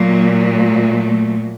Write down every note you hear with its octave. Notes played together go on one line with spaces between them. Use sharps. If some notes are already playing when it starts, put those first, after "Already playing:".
Already playing: A#2 F#3 A3 A#3
A3